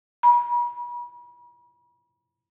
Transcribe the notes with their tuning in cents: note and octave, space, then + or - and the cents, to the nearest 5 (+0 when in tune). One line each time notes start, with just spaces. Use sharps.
B5 -40